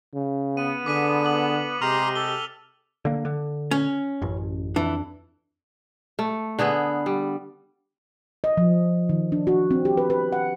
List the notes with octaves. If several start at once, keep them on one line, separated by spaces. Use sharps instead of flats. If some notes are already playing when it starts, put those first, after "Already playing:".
C#3
B3 D#7
D3 G#4 D6 B6 D#7
D6 F#7
C3 G#3 G4 A#5 C6 F6 F7
A4 G7
D3 A#3
D3
C#4
A1 F#2
F2 E3 D4
A3
D3 B3 G#4 B4
G3
D#5
F3
D#3
D4
F#4
C4
G4
B4
B4
F#5